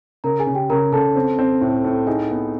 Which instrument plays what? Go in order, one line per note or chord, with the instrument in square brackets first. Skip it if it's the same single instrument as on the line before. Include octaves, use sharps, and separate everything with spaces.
[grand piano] C#3 [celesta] A#4 A#5
[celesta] G#4 G#5
[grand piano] C#3
[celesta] G4 G5
[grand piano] C#3 [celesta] A#4 A#5
[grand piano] C#3 [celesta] A4 A5
[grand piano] C4
C4
A2
A2
[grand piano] D#4 [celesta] G#4 G#5
[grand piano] B3